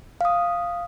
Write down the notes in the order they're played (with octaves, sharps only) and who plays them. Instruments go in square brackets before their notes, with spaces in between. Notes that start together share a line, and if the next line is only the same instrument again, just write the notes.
[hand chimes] F5 D#6